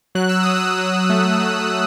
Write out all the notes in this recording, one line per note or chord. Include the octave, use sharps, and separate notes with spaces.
F#3 F#6
E6
F#3 D#6
E6
F#3
A3
F#3